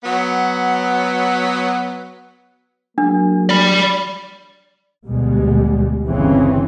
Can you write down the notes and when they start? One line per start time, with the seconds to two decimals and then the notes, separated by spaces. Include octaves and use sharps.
0.03 F#3 B3
2.98 F#3 A#3 D4 G#4
3.49 D5 B5
5.06 D2 B2 G3 G#3
6.06 G1 C#3 E3 C4 C#4